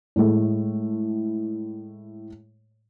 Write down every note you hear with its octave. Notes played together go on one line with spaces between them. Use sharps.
A2 G#3 A3